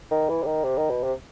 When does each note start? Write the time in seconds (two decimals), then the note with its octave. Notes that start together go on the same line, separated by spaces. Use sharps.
0.11 D#3
0.29 E3
0.43 C3
0.46 D#3
0.64 C3
0.78 D#3
0.90 B2
1.03 C3